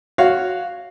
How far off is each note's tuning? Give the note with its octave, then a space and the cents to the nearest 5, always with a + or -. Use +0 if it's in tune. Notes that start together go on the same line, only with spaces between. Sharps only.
F#4 +0 C#5 +0 F5 +0